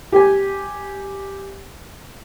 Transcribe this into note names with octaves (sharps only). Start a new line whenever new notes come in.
G4 G#5